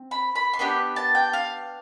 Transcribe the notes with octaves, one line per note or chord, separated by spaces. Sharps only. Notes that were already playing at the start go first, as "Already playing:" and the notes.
Already playing: C4
B5
B5
C6
B3 D4 G4 B5
A5
G5
F5